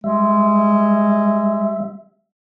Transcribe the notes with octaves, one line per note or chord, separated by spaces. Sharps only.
G3 G#3 E5